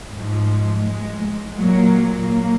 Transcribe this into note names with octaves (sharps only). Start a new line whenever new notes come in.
G#2 F3
G#3
G#3
G#3
A#2 F#3 A#3
A#3